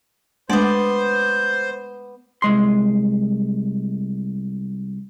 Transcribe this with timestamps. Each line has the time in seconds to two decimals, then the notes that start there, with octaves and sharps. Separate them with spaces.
0.50 G#3 A3 B3 D4 C5 D5
2.42 C2 G#3 C6